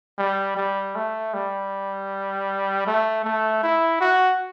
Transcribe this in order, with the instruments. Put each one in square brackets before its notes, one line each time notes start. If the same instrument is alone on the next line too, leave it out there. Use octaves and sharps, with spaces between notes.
[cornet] G3
G3
A3
G3
A3
A3
E4
F#4